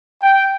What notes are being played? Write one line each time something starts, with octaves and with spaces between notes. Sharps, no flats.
G5